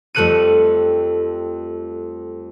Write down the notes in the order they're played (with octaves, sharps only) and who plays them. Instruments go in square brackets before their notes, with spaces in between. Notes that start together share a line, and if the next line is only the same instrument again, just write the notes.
[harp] F2 G3 A3 F#6 C#7 D#7